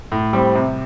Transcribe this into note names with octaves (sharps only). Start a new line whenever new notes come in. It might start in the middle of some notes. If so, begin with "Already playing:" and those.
A2
G3 C4
C3